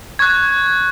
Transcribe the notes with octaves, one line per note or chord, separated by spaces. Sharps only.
C#6 F#6 G#6